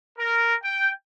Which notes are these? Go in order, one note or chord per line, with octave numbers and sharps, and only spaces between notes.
A#4
G5